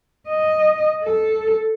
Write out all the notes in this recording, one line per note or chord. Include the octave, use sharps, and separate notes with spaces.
D#5
A4